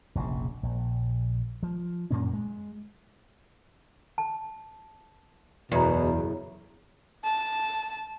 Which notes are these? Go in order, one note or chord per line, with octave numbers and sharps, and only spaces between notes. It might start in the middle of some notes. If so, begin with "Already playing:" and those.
F1 A#1 G#2 C#3
A#1
F3
F#2 A#2 A#3 C#4
G#3
A5
F#1 B1 E2 B2 E5 A#5
A5